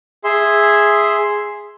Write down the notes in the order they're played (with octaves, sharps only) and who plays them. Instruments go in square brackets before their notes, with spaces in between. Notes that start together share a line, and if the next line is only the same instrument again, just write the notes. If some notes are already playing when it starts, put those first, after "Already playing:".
[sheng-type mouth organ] G#4 E5 C6